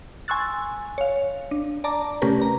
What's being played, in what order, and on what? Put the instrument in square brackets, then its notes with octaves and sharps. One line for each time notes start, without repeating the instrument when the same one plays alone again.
[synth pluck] G#5 C6 C#6 E6 F#6 A6
C#5 F5
D4
D5 A5 A#5 D6
C3 A3 C#4 G4 A#4 B4
A#5